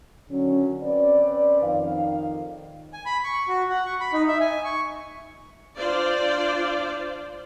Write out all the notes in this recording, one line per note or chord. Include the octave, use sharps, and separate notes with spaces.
D3 D#3 F#3 C#4
C4 C#4 B4 D5
F2 D#3 F5
G#5
B5
C#6
F#4
F#5
C#6
B5
D#4
E5
G#5
C#6
D4 F4 C5 D5